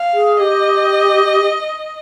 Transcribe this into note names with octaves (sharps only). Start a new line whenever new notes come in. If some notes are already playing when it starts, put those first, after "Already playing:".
Already playing: F5
G#4
G4 D#5